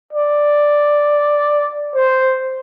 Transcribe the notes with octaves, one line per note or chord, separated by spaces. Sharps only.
D5
C5